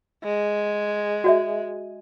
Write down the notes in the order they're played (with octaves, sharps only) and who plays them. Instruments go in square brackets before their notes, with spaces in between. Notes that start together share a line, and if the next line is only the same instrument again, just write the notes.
[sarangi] G#3
[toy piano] F#4 D5 E5